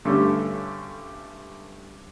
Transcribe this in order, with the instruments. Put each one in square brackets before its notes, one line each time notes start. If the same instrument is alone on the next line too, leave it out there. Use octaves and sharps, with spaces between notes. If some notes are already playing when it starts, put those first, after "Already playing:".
[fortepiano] G2 D3 A3 C#4 G4